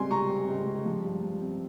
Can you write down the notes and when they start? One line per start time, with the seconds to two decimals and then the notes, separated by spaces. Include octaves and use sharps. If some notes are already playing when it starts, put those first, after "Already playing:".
Already playing: C#2 C3 G3 C4 G#5 C6
0.11 C3 A#5 C#6
0.30 C4
0.48 C#2
0.67 G3
0.85 F3
1.04 G2
1.23 G2
1.42 C4